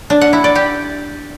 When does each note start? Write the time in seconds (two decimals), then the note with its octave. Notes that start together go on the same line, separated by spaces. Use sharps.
0.10 D4
0.21 F#5
0.33 E4
0.44 D5
0.55 G4